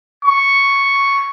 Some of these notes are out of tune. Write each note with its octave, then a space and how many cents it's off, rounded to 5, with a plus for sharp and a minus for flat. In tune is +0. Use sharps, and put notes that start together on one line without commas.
C#6 +0